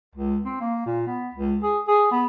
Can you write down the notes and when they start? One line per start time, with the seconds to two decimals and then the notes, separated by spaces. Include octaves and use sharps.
0.15 C#2
0.45 C4
0.60 A#3
0.86 A#2
1.07 B3
1.34 C#2
1.63 G#4
1.88 G#4
2.11 B3